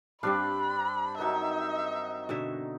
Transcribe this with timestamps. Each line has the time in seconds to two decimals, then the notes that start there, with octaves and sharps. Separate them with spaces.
0.23 G2 G3 C4 D4 F5 B5
1.18 D#3 F#3 D#4 E5
2.29 B2 D3 E5